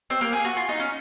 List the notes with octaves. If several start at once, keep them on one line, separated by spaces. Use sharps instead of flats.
C4 C5
A#3 A#4
G#4
F#4
F4
D#4
C#4